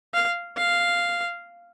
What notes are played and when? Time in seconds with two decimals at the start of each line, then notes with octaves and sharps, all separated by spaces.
0.14 F5
0.57 F5